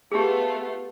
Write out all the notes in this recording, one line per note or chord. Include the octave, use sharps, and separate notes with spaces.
A3 B3 F4 G4 G#4